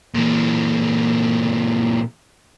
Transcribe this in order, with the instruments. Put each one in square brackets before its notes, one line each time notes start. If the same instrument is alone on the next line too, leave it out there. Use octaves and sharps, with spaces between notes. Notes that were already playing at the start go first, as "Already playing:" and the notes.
[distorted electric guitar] A#2 E3